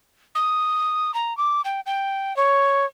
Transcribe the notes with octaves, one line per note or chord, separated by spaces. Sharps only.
D#6
A#5
D6
G5
G5
C#5